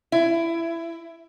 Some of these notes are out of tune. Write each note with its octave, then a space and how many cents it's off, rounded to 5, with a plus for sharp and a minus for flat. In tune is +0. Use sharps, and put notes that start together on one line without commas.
E4 +20